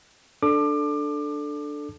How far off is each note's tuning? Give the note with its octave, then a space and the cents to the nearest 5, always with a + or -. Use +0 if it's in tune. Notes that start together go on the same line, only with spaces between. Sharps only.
D4 +5 A4 +0 D6 +25